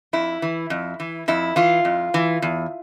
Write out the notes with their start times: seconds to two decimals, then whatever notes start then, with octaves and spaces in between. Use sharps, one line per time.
0.13 F2 E4
0.42 E3
0.70 F2
1.00 E3
1.28 F2 E4
1.56 E3 F4
1.85 F2
2.14 E3
2.42 E2